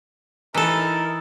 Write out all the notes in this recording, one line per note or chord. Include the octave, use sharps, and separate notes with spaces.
E3 D#4 E4 A4 A#4